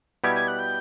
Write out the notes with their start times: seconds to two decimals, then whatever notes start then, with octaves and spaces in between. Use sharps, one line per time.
0.24 B2 G3 B3 E4 G4 G#6
0.35 G#6
0.47 F#6
0.59 G6